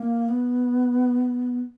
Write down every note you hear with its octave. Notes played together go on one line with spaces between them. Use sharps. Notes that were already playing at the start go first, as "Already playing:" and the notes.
Already playing: A#3
B3